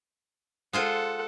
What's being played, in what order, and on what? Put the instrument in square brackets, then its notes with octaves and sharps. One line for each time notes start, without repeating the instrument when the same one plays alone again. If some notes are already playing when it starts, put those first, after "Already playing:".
[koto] G#3 F4 C5 [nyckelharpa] A4 F#5